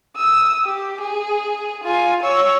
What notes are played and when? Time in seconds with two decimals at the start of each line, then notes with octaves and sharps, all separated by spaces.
0.17 D#6 E6
0.65 G4
1.01 G#4
1.84 F4 G#5
2.23 C#5 E6